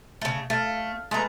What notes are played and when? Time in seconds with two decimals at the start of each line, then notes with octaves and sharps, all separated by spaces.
0.21 C#3 A3
0.50 A3 F5
1.11 G#3 A3 B4 A#5